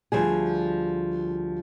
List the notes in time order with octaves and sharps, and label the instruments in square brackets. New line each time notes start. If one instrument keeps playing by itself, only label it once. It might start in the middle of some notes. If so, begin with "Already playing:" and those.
[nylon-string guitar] D2 F3 G3 G#4